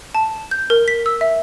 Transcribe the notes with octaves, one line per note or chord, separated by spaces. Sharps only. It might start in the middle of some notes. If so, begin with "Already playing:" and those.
A5
G6
A#4
B6
E6
E5